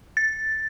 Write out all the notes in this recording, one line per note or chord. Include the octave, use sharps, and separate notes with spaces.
A6